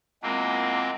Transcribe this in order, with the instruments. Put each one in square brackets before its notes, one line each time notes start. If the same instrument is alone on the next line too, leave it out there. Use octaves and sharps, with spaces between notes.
[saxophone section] E2 A#2 A#3 [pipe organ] G#3 C4